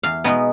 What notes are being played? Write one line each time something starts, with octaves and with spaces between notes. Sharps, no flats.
E2 F5
B2 G#3 B3 D#4